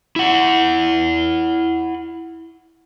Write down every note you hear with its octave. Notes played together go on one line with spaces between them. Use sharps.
E4 F#5